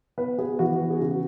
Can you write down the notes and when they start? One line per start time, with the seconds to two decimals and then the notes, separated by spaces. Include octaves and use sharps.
0.18 B3 B4
0.38 B3 G#4
0.59 E3 F#4
0.81 B3
0.90 G#4
1.01 C#3 F#4